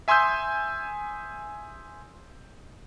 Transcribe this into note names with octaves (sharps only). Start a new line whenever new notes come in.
E5 G#5 C6 D#6 E6 G6